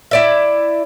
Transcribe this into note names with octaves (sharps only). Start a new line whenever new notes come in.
E4 D5 E5